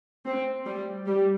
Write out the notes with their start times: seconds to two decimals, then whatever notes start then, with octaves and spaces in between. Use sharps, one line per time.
0.27 C4
0.66 G3
1.07 G3